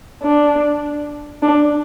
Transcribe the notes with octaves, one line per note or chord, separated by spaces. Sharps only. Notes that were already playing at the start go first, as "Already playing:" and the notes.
D4
D4